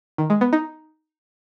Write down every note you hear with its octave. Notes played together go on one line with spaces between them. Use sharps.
D#3
G#3
B3
D#4